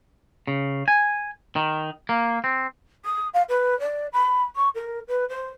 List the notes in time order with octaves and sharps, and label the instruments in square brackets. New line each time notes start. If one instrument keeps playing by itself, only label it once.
[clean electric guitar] C#3
G#5
D#3
A#3
C4
[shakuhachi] D#6
F5
B4
D5
B5
C#6
A#4
B4
C5